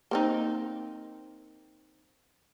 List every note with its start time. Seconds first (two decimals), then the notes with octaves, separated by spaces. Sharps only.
0.11 A#3 C4 D#4